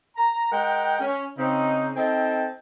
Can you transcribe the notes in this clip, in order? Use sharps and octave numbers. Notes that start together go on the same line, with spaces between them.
A#5
G#3 A#4 F#5 G5
C#4
C#3 C4 D#4
C4 D#4 A4 D#5 G5 A5